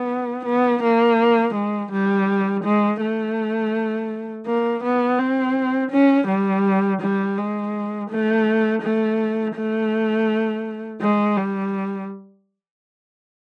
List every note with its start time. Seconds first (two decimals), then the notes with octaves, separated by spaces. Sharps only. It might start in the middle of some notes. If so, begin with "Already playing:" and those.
Already playing: B3
0.46 B3
0.83 A#3
1.55 G#3
1.92 G3
2.64 G#3
3.01 A3
4.47 A#3
4.83 B3
5.19 C4
5.91 C#4
6.27 G3
7.01 G3
7.38 G#3
8.10 A3
8.82 A3
9.56 A3
11.01 G#3
11.37 G3